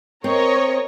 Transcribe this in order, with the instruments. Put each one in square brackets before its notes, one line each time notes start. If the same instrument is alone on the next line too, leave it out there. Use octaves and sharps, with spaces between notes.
[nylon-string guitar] C4 [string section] A#4 C#5 D#5